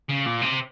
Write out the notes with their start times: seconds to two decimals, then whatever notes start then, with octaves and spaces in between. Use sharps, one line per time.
0.09 C#3
0.26 A#2
0.41 C3